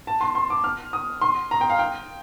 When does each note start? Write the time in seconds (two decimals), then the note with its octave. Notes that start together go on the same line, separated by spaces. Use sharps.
0.07 A5
0.21 C6
0.35 C6
0.50 D6
0.64 F6
0.93 D#6
1.21 C6
1.51 A#5
1.61 G5
1.70 F5
1.79 G5